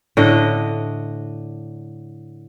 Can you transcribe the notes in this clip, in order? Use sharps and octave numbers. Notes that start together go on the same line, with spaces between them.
A2 D3 D#5